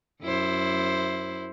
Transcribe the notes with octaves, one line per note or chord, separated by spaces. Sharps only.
F#2 E4 C5